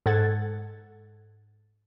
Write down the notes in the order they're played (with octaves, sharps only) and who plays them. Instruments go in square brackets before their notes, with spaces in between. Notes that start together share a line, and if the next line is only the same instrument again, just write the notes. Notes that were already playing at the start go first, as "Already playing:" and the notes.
[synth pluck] G#2 A4 F#5 G#6 A6